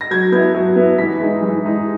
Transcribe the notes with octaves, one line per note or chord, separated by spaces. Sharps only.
A#6
F#3 G#6
B3 E4 G#6
F#3
B3 E4
E3 B6
G#3 D#4
E3
G#3 D#4